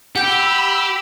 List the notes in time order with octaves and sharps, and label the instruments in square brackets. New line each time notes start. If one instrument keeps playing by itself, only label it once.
[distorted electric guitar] G4 [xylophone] F#5 G6 [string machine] B5 E6